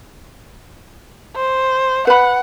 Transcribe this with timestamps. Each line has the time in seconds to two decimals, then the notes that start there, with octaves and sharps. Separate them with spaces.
1.36 C5
2.07 B4 F#5 B5